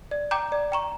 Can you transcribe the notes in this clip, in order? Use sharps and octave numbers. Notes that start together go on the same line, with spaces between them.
D5
G5 A#5 D6 G6
D5
G5 A#5 C#6